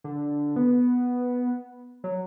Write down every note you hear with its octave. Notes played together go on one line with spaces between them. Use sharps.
D3
B3
F#3